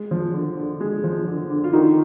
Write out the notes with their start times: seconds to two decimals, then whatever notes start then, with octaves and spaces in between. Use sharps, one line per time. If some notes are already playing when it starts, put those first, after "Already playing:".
Already playing: G#3
0.11 F3
0.33 D3
0.57 D3
0.80 G#3
1.04 F3
1.27 D3
1.50 D3
1.64 F4
1.73 D3 D#3 D#4